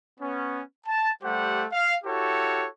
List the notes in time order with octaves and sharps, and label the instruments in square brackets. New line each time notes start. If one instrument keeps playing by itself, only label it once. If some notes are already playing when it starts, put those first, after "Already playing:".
[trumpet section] B3 C#4
A5
G3 A3 G4 C5 F#5
F5
E4 F#4 G4 A4 C#5